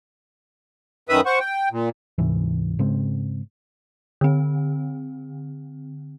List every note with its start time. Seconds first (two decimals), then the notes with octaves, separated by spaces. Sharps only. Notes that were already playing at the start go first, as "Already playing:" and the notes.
1.09 F#2 D#3 B4 E5 B5 D#6
1.26 C5 F#5 C#6
1.40 G5
1.72 A#2
2.18 D2 G#2 C3 E3
2.79 G#2 C#3 G#3 C4
4.21 D3 C4